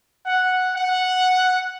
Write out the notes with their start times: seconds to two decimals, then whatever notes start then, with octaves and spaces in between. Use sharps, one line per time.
0.26 F#5
0.73 F#5